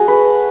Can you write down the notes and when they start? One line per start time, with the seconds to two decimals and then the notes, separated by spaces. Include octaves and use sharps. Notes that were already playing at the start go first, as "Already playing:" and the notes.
Already playing: A3 F#4 G#4
0.08 B4